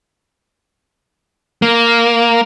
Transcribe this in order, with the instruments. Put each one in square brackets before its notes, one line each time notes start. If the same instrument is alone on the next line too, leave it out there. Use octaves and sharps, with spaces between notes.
[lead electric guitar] A#3